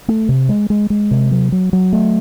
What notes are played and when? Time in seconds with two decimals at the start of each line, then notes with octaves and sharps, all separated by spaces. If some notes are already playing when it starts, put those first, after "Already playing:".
0.08 A3
0.29 C3
0.49 G#3
0.70 G#3
0.90 G#3
1.11 C3
1.31 F#3
1.52 F#3
1.73 F#3
1.93 A3